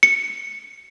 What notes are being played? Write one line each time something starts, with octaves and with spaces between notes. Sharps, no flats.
C#7